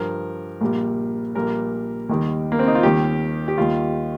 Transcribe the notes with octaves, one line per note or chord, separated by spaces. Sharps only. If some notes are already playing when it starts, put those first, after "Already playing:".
Already playing: G2 F3 A#4
A#1 A#2 G3
A#1 A#2 G3 A#4
D#2 D#3 G3
A#3
C4
D#4
F4
D#2 D#3 G3 G4
G4
D#2 D#3 G3 F4